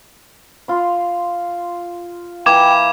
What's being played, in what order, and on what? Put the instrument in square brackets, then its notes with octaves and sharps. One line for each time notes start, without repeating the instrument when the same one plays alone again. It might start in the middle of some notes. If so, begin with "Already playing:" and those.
[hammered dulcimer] F4 C6
[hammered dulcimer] E3 A#3 [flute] G5 [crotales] D6 G#6 E7